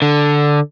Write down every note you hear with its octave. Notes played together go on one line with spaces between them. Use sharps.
D3